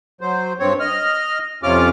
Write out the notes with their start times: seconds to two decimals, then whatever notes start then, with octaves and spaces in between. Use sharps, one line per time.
0.21 F#3 C5
0.60 G2 C4 C#5
0.80 D#5 F6
1.63 F2 C3 C#4 F4 D6 F6